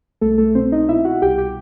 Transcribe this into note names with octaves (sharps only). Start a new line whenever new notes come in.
C2 A3 A4
A3 A4
B2 C4 C5
D#4 D#5
B2 E4 E5
F#4 F#5
C2 G4 G5
G4 G5